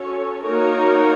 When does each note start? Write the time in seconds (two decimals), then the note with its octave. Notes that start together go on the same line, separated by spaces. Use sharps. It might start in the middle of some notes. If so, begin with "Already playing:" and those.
Already playing: C#4 F#4 A4 C#5
0.45 A#3 D#4 F#4 A#4 C#5